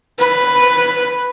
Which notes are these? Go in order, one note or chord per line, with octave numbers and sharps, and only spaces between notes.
B4